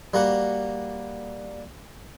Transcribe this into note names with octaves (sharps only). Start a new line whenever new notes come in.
G3 A#3 F#4 F#5